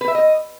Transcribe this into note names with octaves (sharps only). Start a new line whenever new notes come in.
B4
E5
D#5